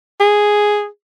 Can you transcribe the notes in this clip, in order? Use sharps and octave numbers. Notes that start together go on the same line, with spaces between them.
G#4